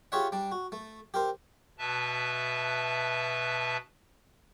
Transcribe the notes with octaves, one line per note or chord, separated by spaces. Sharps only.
F4 G4 G#4 C#5 E5 F#5
G3 D4
F#4
A3
G4 A#4 C5
B2 B4 E5 A5